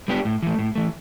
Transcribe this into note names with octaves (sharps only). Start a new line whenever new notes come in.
G3 B3 D4 G4
A2
E3 A3
A2
E3 A3